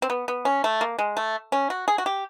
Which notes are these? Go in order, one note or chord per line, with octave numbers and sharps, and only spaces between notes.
C4
B3
B3
C#4
A3
A#3
G#3
A3
C#4
F#4
G#4
F#4
G4